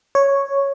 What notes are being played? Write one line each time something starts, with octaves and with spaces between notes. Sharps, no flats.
C#5